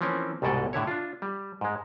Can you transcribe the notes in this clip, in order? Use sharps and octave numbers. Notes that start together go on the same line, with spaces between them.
E3 F3 A#3 C4 C#4
C2 G#2 B2 A4 D5 D#5
A2 D3 E4 C#5
D4 F4
G3
G#2 G#3